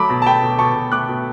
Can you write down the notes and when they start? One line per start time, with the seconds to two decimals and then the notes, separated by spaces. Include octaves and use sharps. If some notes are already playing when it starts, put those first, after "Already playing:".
Already playing: F#3 A3 B5 D6
0.10 B2
0.22 A5
0.26 A3 G5 B5
0.42 B2
0.59 B2 A5 C#6
0.75 B2
0.92 A3 D6 F#6
1.09 B2